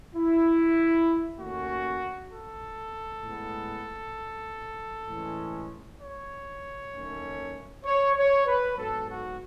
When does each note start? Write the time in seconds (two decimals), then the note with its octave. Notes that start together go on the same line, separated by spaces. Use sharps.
0.15 E4
1.38 D#2 D#3 A3 C#4 F#4
2.31 A4
3.23 A2 G#3 B3
5.07 A2 E3 G#3 C#4
6.00 C#5
6.92 D#2 D#3 F#3 A3 C#4
7.84 C#5
8.15 C#5
8.46 B4
8.77 G#2 F#3 B3 A4
9.07 F#4